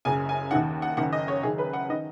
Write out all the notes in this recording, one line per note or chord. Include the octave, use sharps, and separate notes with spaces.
F#1 F#2 C#3 G#5
G#5
D#2 D#3 F#5
F#5
F#1 F#2 D#3 F#5
D#5
C#5
F#1 F#2 D#3 G#4
B4
F#5
D#3 D#5